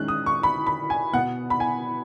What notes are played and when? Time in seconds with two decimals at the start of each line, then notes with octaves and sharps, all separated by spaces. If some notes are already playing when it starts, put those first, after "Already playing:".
Already playing: D#3 G#3 C#4 F#6
0.08 D#6
0.26 C#6
0.43 B5
0.67 B5
0.90 G#5
1.13 B2 F#5
1.17 B3
1.50 B5
1.60 G#5